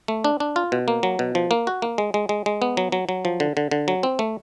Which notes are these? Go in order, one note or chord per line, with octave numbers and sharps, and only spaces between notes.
A3
D4
D4
F4
B2
A#3
F#3
B2
F3
A#3
F#4
A#3
G#3
G#3
G#3
G#3
B3
F#3
F#3
F#3
F3
D3
D3
D3
F#3
C4
A3